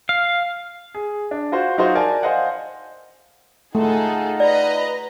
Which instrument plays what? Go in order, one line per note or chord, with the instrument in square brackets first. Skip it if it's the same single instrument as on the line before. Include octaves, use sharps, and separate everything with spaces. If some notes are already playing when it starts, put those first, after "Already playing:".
[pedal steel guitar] F5
[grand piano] G#4
D4
F4 F#4 C5
F#3 D#4 F4 F#4 C5 E5
A#4 D5 G#5 A5
C5 D#5 F5 F#5 G#5
[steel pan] A3 [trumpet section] D#4 F4 F#5 [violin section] G#4 A4
[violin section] B4 D#5 A#5 [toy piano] D5